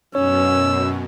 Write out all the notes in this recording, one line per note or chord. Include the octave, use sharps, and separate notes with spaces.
F#2 B2 C#4 C#5 E6